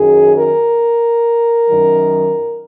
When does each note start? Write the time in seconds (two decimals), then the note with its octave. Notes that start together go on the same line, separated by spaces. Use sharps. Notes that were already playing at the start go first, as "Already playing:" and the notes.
Already playing: F#2 D#3 F#3 G#4
0.34 A#4
1.70 F#2 D#3 F#3